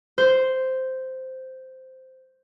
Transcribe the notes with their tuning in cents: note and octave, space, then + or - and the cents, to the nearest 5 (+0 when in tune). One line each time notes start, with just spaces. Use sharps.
C5 -5